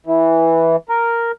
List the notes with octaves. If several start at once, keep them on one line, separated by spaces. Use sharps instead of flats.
E3
A#4